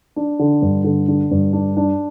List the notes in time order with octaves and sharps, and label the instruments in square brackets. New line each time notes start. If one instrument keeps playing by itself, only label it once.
[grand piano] D4
D3
G2
D3
D3
G2
D4
D4